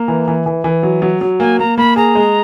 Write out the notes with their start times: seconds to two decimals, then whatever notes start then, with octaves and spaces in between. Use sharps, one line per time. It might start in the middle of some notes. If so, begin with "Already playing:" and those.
Already playing: A#3 A#5
0.08 E3
0.28 E3
0.46 E3
0.64 E3
0.83 F#3
1.02 F#3
1.21 F#3
1.40 A#3 G#5
1.59 A#3 A#5
1.77 A#3 B5
1.96 G#4 A#5
2.15 G#3